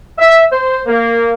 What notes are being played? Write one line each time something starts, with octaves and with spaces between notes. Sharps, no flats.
E5
C5
A#3